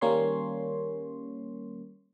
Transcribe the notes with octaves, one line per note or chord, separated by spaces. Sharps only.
D#3 G3 A#3 C#4 C#5 C6